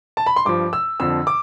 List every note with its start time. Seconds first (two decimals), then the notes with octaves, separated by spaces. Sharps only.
0.17 A5
0.26 B5
0.36 C6
0.45 G2 F3 D6
0.73 E6
1.00 F2 D3 F3 E6
1.27 D6